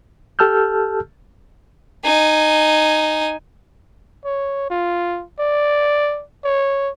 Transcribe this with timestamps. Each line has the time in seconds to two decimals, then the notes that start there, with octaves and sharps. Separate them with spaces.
0.39 G4 A4 A5 E6 F6 G6
2.04 D#4 G#5
4.25 C#5
4.70 F4
5.40 D5
6.45 C#5